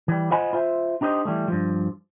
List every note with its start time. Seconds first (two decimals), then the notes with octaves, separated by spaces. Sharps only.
0.08 E3 G3
0.31 F4 C5 D#5 F#5 G#5 B5
0.53 F4 C5 E5
1.01 D4 D#4 G4 C5 D#5
1.25 E3 G3 A3
1.48 G2 F3